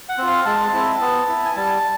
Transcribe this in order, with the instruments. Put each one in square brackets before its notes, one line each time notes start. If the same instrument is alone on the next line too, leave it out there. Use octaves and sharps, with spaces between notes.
[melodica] F#5
C4 F4
F5
G#3 A5
C4 E4
B3
E4
G#5
G3 A5